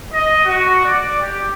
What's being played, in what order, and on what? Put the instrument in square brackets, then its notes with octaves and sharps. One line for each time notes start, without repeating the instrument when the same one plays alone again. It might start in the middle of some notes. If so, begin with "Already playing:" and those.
[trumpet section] D#5
F#4
D5
G4